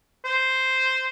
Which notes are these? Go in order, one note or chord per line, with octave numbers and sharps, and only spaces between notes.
C5